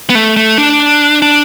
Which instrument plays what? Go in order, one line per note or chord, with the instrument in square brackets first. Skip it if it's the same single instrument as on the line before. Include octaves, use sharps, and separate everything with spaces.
[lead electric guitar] B3
A3
A3
D4
D4